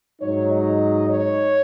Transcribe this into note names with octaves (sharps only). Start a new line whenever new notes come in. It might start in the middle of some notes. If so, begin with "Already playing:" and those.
G#2 F#3 D#4 C#5
D#5
C#5